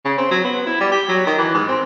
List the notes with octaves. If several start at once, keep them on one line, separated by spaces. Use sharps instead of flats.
C#3
C4
F#3
B3
E4
G3
G4
F#3
D#3
E3
G#2
C4